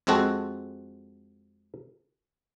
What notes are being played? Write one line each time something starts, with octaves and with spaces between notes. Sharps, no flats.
F2 G#3 C4 F#4 A4 A5